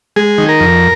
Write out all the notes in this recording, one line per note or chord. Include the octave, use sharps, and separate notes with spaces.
G#3 G#4
D#3
A#4
F2